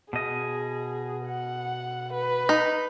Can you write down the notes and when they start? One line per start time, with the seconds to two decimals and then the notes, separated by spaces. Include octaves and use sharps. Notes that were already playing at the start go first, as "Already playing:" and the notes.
0.13 B2 G#4 D#5
1.26 F#5
2.13 B4
2.49 D#4